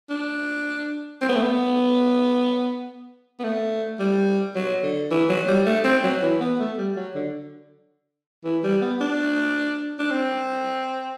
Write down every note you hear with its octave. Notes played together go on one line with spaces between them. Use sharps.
D4
C4
B3
A3
B3
B3
A3
G3
F#3
D3
E3
F#3
G3
A3
C4
F#3
E3
B3
A3
G3
F#3
D3
E3
G3
B3
D4
D4
C4